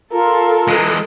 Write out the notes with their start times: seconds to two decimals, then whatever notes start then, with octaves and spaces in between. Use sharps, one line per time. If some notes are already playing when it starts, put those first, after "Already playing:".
0.12 F4 A4 A#4
0.68 E3 G#3